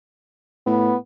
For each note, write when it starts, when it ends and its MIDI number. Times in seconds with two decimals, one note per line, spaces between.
0.66 0.95 45
0.66 0.96 59